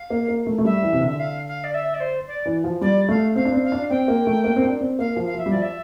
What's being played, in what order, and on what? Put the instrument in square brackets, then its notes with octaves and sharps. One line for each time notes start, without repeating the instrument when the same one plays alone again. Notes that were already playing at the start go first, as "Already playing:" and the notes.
Already playing: [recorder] F5
[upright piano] A#3
A#3
A3
A3
[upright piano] G3 [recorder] E5
[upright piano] E3
C3
D3
[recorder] E5
F5
F5
D5
E5
D5
C5
D5
[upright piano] E3
F3
[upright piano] G3 [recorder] D5
[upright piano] A3 [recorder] F5
[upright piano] C4 [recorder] F5
[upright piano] D4
C4
[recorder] F5
[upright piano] D4
[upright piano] C4 [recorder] G5
[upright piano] A#3
A3
A#3
C4
D4
C4
[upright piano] A#3 [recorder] F5
[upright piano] F3
[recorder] F5
[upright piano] F3 [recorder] E5
[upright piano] G3
[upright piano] F3 [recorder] D5
[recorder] E5